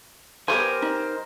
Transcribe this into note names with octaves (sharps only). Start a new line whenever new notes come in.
F3 G3 B3 G4 A#4 C5 G#5
D#4